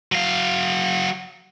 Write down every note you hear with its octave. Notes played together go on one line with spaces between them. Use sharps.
F#3 F5